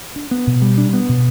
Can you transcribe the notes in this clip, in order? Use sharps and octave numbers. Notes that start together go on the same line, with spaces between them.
D4
B3
B2
G3
D4
B3
B2